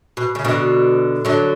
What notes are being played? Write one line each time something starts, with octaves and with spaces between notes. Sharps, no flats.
B2
C#3
B2 D3
D3 F#3